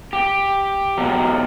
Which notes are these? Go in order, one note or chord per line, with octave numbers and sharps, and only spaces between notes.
G4
B2 F#3